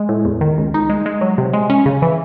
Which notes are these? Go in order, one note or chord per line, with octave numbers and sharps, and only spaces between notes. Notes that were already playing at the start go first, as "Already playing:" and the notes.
Already playing: G#3
A2
E2
D#3
C#2
D#4
G#3
G#3
F#3
C3
G#3
C#4
C#3
E3